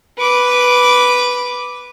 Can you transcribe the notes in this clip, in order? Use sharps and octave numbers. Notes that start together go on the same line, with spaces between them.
B4 D6